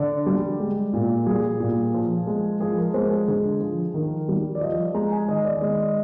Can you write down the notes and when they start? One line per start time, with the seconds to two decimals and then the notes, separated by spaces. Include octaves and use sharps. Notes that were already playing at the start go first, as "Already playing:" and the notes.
Already playing: D3 D5
0.26 G3
0.60 G#3
0.93 A#2
1.26 G3 G#4
1.60 A#2
1.94 F3
2.27 G#3
2.60 F3 G#4
2.77 A#4
2.94 G#3 C5
3.11 G#4
3.28 D3 G#4
3.61 F3
3.94 D#3 A#4
4.29 G3
4.55 D5
4.61 F3 D#5
4.94 G#3 A#5
5.12 G#5
5.28 D#3 D#5
5.45 D5
5.61 G#3 D#5
5.78 D#5